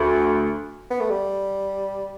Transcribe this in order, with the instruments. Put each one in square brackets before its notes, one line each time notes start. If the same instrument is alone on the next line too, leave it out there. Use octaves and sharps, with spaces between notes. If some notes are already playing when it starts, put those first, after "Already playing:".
Already playing: [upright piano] D2 [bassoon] A3
[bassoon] B3
A3
G3